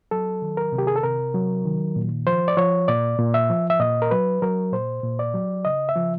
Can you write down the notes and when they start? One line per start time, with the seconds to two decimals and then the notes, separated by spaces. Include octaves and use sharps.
0.11 F#3 A4
0.42 D#3
0.57 A#4
0.72 C3
0.78 G4
0.87 G#4
0.96 A4
1.03 C3 A#4
1.34 F#3
1.65 D#3
1.96 A#2
2.27 F3 C5
2.48 D5
2.57 F3 C#5
2.88 A#2 D5
3.19 A#2
3.34 E5
3.50 F3
3.70 E5
3.80 A#2 D#5
4.02 A#4
4.11 F#3 B4
4.42 F#3 A#4
4.73 A#2 C5
5.03 A#2
5.19 D5
5.34 F#3
5.65 C#3 D#5
5.89 E5
5.96 F3